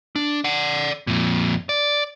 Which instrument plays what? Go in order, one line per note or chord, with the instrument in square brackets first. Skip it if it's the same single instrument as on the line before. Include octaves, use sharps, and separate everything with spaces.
[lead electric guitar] D4
D5 F#5
F2 A#2
D5